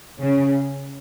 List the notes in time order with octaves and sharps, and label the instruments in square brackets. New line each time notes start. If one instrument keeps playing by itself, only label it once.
[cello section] C#3